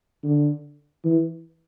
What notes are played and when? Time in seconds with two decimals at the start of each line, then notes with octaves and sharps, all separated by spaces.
0.24 D3
1.05 E3